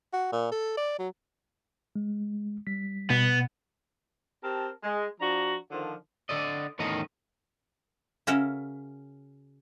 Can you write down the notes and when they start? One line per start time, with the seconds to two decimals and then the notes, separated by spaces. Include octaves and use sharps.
0.13 F#4
0.32 A#2
0.52 A4
0.77 D5
0.99 F#3
1.96 G#3
2.67 G3 B6
3.10 B2 B3
4.43 C4 G4 A#4 A5
4.84 G#3
5.21 F3 D4 F#4 A#5
5.72 D3 D#3 F3
6.29 D3 A4 D5 D#5
6.79 E2 A2 D#3 C#4 A4 D#5
8.27 C#3 C#4 F#4 A#4 E5